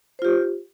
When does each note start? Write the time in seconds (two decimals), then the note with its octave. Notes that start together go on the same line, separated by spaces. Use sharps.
0.19 C5
0.22 F4
0.25 G4